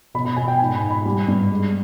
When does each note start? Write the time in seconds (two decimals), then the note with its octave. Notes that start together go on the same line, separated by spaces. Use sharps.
0.14 B2 B5
0.25 B5
0.37 B2 G#5
0.48 G5
0.59 G#2 G#5
0.75 B5
0.82 G#2
0.91 B5
1.05 G3
1.28 G2
1.51 G#3